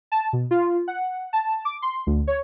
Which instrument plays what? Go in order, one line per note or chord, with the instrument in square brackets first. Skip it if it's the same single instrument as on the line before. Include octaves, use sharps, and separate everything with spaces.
[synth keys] A5
B2
F4
F#5
A5
D6
C6
D2
C#5